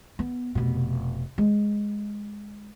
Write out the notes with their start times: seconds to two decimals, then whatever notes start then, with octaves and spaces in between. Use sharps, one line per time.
0.19 B3
0.55 F1 B2
1.38 G#3